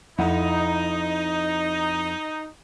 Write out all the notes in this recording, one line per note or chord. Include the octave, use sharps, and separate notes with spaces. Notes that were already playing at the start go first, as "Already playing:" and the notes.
F2 D#4 E4 F#5